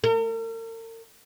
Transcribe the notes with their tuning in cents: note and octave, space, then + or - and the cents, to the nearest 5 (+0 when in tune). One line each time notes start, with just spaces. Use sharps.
A#4 -45